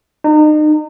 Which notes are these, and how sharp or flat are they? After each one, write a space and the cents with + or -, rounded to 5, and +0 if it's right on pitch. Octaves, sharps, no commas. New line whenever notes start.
D#4 -35